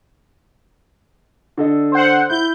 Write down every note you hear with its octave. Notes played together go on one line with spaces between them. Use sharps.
D3 A4 D#5
C5 F#5
E4 G6